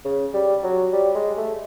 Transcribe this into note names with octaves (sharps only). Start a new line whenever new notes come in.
C#3
G3
F#3
G3
G#3
A3